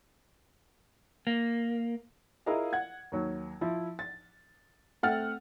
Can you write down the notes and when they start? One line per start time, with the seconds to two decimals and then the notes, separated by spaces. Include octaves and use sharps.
1.27 A#3
2.46 E4 F4 G#4 A#4 D#5 F5
2.73 F#5 G#6
3.12 D#2 F#3
3.61 F3 E4
3.99 A6
5.03 A3 C4 F#5 F6 A6